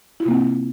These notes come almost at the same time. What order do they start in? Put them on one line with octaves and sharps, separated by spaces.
E4 F4 C3 A#3 C4